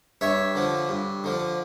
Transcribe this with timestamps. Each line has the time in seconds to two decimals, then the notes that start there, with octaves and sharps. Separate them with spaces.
0.21 G2 C#5 E5
0.55 D3 F3
0.89 G2
1.24 D3 F3